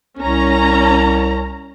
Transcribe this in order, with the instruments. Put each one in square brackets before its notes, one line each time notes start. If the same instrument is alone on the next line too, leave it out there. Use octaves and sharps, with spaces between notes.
[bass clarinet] C2 [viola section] C#4 A#5